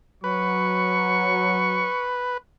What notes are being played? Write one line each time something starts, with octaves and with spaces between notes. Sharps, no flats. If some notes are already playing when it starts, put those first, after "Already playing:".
F#3 B4 C#6